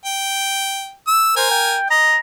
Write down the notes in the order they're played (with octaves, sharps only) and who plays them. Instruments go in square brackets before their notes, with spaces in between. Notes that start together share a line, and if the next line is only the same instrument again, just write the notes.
[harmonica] G5
E6
[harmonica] A#4 G#5 [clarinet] C5
[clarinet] G5
[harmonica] D#5 [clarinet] A#5